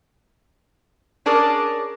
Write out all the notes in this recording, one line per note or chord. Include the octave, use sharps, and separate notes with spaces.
C#4 D4 G#4 A#4 D5